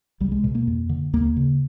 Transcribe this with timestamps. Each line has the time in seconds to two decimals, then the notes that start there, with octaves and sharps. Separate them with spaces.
0.20 C2 G3
0.32 G#3
0.44 B2
0.55 A#3
0.67 F2
0.89 D3
1.13 D#2 A#3
1.36 C#3